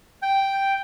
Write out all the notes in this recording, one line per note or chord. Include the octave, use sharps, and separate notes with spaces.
G5